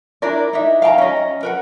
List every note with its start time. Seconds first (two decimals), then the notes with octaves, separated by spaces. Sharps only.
0.22 D4 E4 A#4 D5
0.53 D#4 E4 E5
0.82 F5 G5 A5 A#5
0.98 C#4 D#5
1.43 A#4 B4 F#5